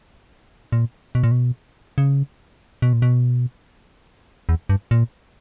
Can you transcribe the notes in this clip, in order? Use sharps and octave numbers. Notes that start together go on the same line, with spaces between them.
A#2
B2
A#2
B2
C#3
B2
A#2
B2
E2
G2
A#2